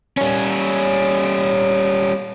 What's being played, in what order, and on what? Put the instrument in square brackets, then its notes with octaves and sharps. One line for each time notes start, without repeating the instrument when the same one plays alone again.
[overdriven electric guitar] G3 C#4